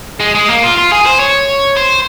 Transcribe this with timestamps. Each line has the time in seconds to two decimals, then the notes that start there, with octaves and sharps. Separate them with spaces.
0.20 G#3
0.35 G#3
0.49 A#3
0.63 F4
0.78 F4
0.92 G#4
1.06 C5
1.19 C#5
1.77 C5